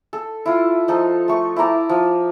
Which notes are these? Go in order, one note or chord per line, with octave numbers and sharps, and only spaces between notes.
A4
E4 F4
F3 D#4 A4
A3 C#6
E4 A5 A#5 D6
F3